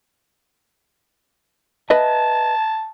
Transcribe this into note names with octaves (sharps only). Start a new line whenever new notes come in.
B4 D#5 E5 A5